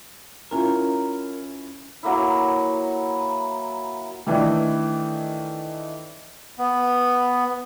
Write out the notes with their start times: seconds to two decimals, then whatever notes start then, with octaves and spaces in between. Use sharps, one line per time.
0.51 C#4 E4 F4 A#4
2.03 F#3 A#3 E4
4.27 D#3 E3 A3 D4 D#4
6.58 B3